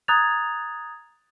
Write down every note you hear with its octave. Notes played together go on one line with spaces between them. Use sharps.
A#5 D#6 F#6 G#6 A6 F7